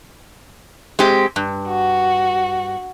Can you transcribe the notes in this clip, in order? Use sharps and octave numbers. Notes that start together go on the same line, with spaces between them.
G#3 C4 G4
G2
F#4